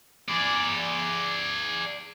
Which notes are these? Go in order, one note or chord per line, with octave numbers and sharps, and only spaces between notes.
G#4 D5